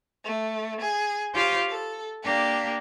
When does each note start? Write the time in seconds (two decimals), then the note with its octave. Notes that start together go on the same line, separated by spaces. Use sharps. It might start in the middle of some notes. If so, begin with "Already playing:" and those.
0.23 A3
0.80 G#4
1.34 F4 G4 C5 C#5 F5
1.68 A4
2.23 A#3 D4 G4